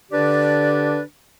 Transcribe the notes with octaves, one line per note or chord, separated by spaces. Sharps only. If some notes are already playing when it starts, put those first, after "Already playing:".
D3 D4 G4 B4 D5